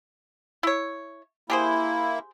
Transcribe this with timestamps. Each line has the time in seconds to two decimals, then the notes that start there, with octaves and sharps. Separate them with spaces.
0.63 E4 C#5
1.50 A#3 E4 G4 G#4 C5